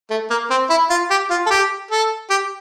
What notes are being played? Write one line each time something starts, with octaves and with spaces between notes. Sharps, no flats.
A3
A#3
C4
E4
F4
G4
F4
A4
G4
A4
G4